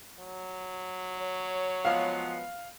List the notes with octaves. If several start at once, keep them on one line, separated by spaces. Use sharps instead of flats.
F#3
C#5
F3 G#3 B3 F5